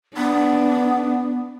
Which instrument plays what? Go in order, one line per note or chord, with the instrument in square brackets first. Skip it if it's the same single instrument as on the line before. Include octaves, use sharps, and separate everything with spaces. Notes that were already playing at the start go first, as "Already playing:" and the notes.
[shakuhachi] B3 [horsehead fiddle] D4